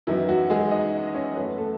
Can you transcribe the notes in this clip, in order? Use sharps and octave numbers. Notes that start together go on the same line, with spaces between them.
F#2 D#3 E3 F#3 B3 E4
F#3 F#4
G#3 G#4
D#4 D#5
C#4 C#5
F#2 E3 A3 B3 B4
A3 A4